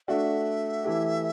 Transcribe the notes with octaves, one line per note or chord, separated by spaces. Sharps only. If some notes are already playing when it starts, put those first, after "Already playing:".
A3 D4 F#4 E5
E3 A3 E4 G4